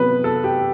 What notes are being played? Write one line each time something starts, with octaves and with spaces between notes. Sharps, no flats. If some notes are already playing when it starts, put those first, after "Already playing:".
Already playing: C3 F#3 B3 B4
A4
G4